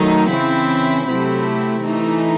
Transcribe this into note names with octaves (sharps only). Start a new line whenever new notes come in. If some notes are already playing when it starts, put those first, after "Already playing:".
Already playing: D#3 F#3 A3 D#4
C#3 E3 C4 E4
C3 F#3 A3 C4 E4
E3 A3 D#4